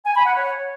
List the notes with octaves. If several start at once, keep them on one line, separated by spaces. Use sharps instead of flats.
G#5
B5
F#5
C#5